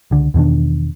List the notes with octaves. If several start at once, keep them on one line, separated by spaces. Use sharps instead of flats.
C#2 D3
E2 B2 D#3 D4